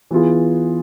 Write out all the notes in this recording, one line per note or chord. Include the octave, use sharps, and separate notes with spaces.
E3 B3 F4 G#4